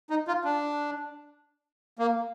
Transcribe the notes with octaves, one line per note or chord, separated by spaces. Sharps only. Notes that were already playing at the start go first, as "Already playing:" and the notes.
D#4
F4
D4
A#3